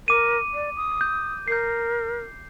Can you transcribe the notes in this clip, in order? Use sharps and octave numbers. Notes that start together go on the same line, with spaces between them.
A#4 D6 D#7
D5
D#6
G6
A#4 G6 C7